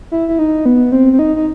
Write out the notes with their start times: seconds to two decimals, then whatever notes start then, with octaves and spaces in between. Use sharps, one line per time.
0.12 E4
0.28 E4
0.39 D#4
0.66 B3
0.92 C4
1.13 C4
1.19 D#4
1.36 D#4